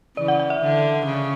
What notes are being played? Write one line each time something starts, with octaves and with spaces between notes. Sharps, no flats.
C#3 E3 D5
F#5
F#5
E5
D3
C#3